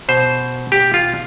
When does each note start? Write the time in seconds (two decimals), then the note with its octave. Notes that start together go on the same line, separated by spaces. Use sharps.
0.09 B2 C5
0.72 G4
0.94 F4